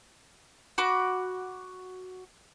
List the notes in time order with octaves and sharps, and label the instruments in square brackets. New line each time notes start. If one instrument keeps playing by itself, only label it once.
[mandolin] F#4 B5 D6